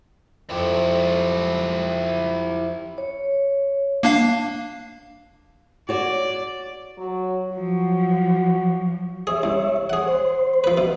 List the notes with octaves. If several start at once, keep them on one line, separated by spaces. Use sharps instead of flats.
F2 E4 G4
C#5
A#3 D4 F5
F#4 C#5 D5
F#3
F3 F#3 F#4
G#4 C#5 E5
C2
G#4 C#5 F#5
C5
F3 B4
B2